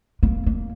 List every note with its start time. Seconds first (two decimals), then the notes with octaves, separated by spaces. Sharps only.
0.23 A#3
0.46 A#3